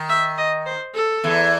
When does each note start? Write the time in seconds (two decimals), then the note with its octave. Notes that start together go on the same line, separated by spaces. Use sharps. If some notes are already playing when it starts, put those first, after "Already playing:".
Already playing: D#3
0.09 E5
0.37 D#5
0.66 C5
0.95 A4
1.24 E2 E3